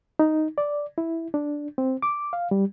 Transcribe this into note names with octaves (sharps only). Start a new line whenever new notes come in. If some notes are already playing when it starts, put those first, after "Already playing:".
D#4
D5
E4
D4
C4
D6
F5
G3